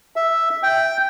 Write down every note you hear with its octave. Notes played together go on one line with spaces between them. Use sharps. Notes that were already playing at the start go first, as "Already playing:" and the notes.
E5
G5